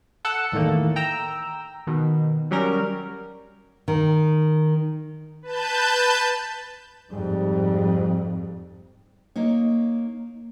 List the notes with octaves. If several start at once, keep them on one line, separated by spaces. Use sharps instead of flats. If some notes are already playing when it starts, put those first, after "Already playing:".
A4 F#5 E6
E2 A2 D#3 A3 A#3
G5 A#5 E6
B2 D#3
F#3 G3 C#4 A#4
D#3
B4 A5 G6
F2 G#2 G3
A#3 D#4 C#5